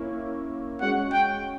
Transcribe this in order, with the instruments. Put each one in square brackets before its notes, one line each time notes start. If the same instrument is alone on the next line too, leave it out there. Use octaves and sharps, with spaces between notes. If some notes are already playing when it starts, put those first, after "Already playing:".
Already playing: [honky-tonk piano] A#3 C#4 E4
[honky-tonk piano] G#3 C#4 F#4 [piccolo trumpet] F#5
[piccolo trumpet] G5